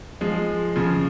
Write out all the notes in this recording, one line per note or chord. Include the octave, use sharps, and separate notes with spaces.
F3 G#3
C#3 F3